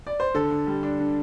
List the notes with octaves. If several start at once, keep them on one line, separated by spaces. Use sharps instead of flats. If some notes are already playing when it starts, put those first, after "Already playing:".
D5
C5
D3 A4
D3
G3
D4
D3